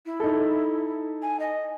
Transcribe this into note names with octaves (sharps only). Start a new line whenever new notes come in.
E4
D#4 A4
G#5
D#5